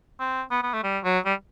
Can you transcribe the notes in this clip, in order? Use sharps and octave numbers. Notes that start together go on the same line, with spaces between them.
C4
B3
B3
A3
G3
F#3
G3